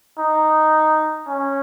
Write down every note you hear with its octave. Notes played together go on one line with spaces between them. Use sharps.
D#4
C#4